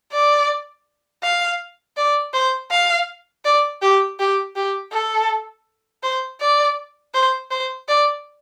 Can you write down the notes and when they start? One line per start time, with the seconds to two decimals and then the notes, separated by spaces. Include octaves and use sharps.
0.12 D5
1.23 F5
1.97 D5
2.34 C5
2.71 F5
3.45 D5
3.82 G4
4.19 G4
4.56 G4
4.92 A4
6.03 C5
6.40 D5
7.14 C5
7.51 C5
7.88 D5